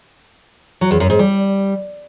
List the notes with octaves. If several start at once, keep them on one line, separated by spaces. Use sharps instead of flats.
F#3
E2
F#2
G#2
G3